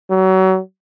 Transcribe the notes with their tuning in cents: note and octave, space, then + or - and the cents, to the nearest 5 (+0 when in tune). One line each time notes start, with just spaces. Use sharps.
F#3 +30